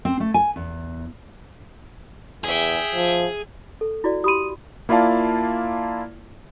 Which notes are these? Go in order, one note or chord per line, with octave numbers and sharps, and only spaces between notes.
C4
A3
G#5
E2
E2 G#4 E5 G5
F3
A4
E4 F#4 D5
G4 B5 C6 D#6 D#7
A#3 E4 F4 D5 F5 A5